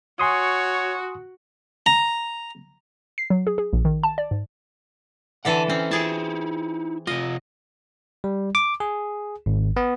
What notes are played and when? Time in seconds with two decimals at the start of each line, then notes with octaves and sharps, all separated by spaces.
0.19 F#4 C#5 G#5 C6 D#6
1.86 A#5
3.18 C7
3.30 F#3
3.47 G#4
3.58 G#4
3.73 A#1
3.85 D#3
4.03 A5
4.18 D5
4.31 G#2
5.45 D3 E3 A4 F#5 A5
5.70 C4 C#4
5.91 D#4 E4 G#4 A5
7.07 C3 F4 D#5
8.24 G3
8.55 D6
8.80 G#4
9.46 G#1
9.77 B3